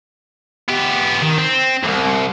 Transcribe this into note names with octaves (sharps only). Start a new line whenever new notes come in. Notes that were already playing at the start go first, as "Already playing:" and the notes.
B3 G4
D#3
C4
C2 F2